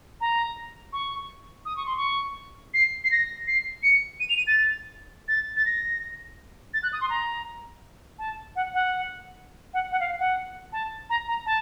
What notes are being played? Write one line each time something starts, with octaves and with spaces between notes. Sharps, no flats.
A#5
C#6
D#6
C#6
C6
C#6
C7
C7
A#6
C7
C#7
D#7
F7
D#7
A6
A6
A6
A#6
A6
F#6
D#6
C6
A#5
A5
F#5
F#5
F#5
F#5
F5
F#5
A5
A#5
A#5
A5